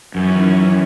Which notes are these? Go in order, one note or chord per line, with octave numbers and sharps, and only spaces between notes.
F#2 D#3 E3 C#4